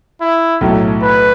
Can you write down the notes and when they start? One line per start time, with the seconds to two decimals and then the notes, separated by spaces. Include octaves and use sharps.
0.21 E4
0.61 B1 A2 F#3 A3
1.02 B4